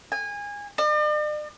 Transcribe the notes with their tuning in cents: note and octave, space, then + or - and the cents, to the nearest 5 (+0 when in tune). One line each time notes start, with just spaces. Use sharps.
G#5 -25
D5 +45